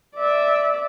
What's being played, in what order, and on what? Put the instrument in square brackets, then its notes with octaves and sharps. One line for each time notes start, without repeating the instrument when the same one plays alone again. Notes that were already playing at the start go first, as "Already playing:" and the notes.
[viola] D5 E5